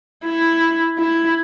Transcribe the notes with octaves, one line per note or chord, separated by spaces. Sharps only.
E4
E4